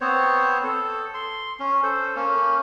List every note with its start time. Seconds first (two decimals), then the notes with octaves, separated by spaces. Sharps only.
0.01 B3 C4 C5 C#5
0.64 A4
1.14 C6
1.59 C#4
1.83 A4 C5
2.16 A#3 C#4